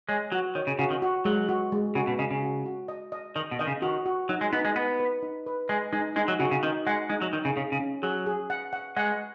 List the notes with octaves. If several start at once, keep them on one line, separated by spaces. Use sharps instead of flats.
G#3 C#5
F#3 F#4
D#3 C#5
C#3
C#3 F#4
D#3
F#4
F#3 G#3
F#4
G#3
C#3 F#4
B2
C#3 D#5
C#3
F#4
F#4
D#5
D#5
D#3 D#5
B2
D#3 D#5
C#3
D#3 F#4
F#4
F#3 D#4
G#3
B3 D#4
G#3
B3 D#4
B4
D#4
B4
G#3 D#5
G#3 D#4
G#3 D#4
F#3
C#3 F#4
C#3
D#3 D#4
G#3 F#5
G#3 D#4
F#3
D#3 D#4
C#3
C#3 G#4
C#3
C#4
F#3 G#4
G#4
F#5
F#5
G#3 F#5